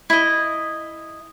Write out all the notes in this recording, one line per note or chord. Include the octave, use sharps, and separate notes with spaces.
E4 D#5